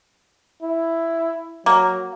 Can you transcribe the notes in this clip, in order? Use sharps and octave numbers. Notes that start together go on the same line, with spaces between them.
E4
F#3 A#3